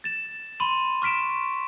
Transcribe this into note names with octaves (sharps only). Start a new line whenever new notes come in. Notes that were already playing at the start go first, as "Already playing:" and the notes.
A6 E7
B5 C6 D#7
C#6 F6 B6 D7 E7